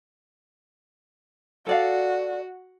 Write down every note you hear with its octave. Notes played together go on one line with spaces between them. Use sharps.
F#4 A4 D5 F5